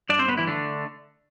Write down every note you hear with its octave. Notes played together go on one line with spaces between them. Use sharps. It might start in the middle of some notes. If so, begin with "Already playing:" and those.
G2 D4 D5
C4 C5
D3 B3 B4
E3 E4
D3 A3 D4